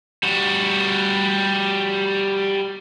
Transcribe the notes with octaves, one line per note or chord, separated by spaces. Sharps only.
G3 F#4